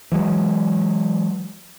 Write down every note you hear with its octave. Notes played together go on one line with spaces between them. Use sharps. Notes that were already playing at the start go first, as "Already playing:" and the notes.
E3 F#3 G#3